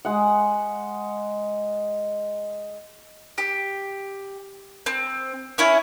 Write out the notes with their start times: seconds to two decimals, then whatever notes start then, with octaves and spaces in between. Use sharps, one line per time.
0.05 G#3 F#5
3.38 G4
4.86 C4
5.58 C#4 E4 C#5